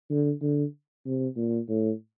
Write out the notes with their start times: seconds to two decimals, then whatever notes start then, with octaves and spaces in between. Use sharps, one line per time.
0.10 D3
0.42 D3
1.06 C3
1.37 A#2
1.69 A2